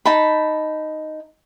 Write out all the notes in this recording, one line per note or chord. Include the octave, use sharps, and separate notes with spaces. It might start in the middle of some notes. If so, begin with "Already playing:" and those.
D#4 A5 B5